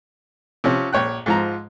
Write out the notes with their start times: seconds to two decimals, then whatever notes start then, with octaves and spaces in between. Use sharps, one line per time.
0.64 C3 F3 C#4
0.93 A#1 C#5 G5 F#6
1.26 G#2 F3 A#5